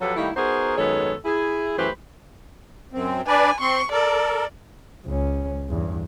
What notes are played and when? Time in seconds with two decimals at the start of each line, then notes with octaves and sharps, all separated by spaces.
0.01 F3 F#3 G4 A4 B4 C#5
0.16 D#3 G3 A3 A#3 D#4 E4
0.36 B3 D#4 F#4 G#4 A#4 C5
0.77 F#2 D#3 G#3 B3 A4 C#5
1.25 E4 G#4
1.77 F#2 E3 A3 G4 B4 C5
2.93 F#2 C4
3.27 D4 B4 D5 G#5
3.61 C4 C6 C#6
3.92 A4 A#4 D5
5.05 C#2 C#4
5.69 E2 G2